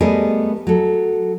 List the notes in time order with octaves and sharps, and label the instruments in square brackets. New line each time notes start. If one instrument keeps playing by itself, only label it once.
[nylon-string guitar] G3 A3 B3 G#4 A#4 D#5
F#3 A4